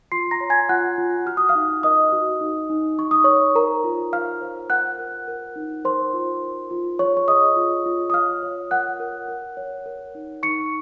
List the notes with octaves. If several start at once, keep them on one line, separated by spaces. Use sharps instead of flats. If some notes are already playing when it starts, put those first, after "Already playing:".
F4 C6 C7
A#5 A#6
C#5
G#5 G#6
F4 F#5 F#6
F4
F#4 F6
D#6
F5 F6
D#4
A#4 D#5 D#6
F#4
D#4
D#4
D#4 C#6
D#6
A#4 C#5 C#6
A#4 C5 A#5
F4
F4 F5 F6
C5
A#4 F#5 F#6
A#4
A#4
D#4
A#4 C5 C6
F4
A#4
F4
G#4 C#5 C#6
C#6
G#4 D#5 D#6
F4
F4
D#6
C#5 F5 F6
C#5
A#4 F#5 F#6
A#4
A#4
C#5
A#4
D#4
D#4 C#6 C#7